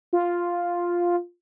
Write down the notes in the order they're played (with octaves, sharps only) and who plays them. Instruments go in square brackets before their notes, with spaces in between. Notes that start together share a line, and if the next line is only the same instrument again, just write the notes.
[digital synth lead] F4